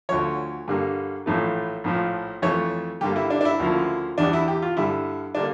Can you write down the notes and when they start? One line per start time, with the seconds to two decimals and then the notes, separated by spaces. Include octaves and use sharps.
0.09 D2 D3 F3 C#5
0.68 G2 D3 G3 A#3
1.26 A#1 A2 E3 A3
1.84 A#1 A2 F3
2.42 F2 E3 A3 C#5
3.01 G2 D3 G3 A#3 G4
3.16 E4
3.30 D4
3.41 D4
3.45 E4
3.59 D2 C#3 F3 A#3
4.18 E2 E3 G3 D4
4.33 E4
4.48 G4
4.62 F4
4.77 G2 D3 G3 E4
5.35 D3 G3 A#3 D4